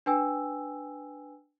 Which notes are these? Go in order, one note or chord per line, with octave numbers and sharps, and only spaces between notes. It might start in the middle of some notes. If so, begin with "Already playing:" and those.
D4 B4 G5 G#5 E6